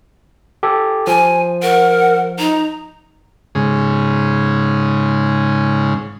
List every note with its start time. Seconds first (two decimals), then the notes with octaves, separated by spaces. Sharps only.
0.63 G4 A4
1.07 F3 G#5
1.63 A#4 F#5
2.39 D#4 A#5
3.55 G#2 C#3